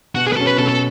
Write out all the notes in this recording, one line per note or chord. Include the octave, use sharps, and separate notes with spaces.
B2 F#4
G#4
B4
F#3 C#4 A4
B4
B2 A4
A4